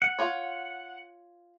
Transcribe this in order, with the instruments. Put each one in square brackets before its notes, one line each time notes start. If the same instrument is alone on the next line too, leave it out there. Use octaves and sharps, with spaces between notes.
[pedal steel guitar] F#5
[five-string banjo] F4 C#5